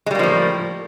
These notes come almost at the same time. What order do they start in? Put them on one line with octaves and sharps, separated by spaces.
G#3 G3 A#3 F3 A2